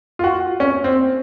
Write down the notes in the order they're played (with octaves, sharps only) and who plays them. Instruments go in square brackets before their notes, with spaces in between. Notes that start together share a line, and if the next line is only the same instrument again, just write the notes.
[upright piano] F4
F#4
C#4
C4